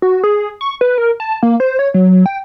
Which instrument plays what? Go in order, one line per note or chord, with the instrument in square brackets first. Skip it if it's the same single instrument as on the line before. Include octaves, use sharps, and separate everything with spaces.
[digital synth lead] F#4
G#4
C#6
B4
A#4
A5
A#3
C5
C#5
F#3
G5